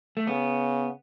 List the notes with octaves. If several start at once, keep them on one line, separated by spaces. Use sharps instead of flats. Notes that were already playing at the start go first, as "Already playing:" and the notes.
A3
C#3 B3